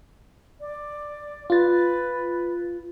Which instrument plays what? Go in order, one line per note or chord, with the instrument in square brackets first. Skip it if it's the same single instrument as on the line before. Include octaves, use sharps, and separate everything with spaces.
[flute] D5
[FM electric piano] F4 A6 [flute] B4